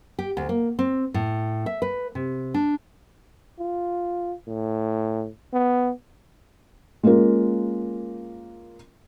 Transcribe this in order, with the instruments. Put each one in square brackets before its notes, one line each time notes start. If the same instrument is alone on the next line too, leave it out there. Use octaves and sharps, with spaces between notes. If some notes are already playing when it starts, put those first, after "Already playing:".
[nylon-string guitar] G4
D2
A#3
C4
A2
E5
B4
C3
D4
[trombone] F4
A2
B3
[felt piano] G#3 A#3 C#4 F4 A#4